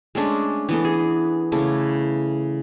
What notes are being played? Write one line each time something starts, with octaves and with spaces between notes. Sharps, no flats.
G#3 A3 C#4 D4
E3 B3 A4
G#4
C#3 A3 E4 D6